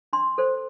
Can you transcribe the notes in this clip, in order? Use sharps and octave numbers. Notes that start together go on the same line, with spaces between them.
D4 C6
A4 C5